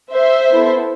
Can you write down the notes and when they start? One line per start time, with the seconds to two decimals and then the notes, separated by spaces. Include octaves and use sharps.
0.12 C5 E5
0.52 B3 E4 A4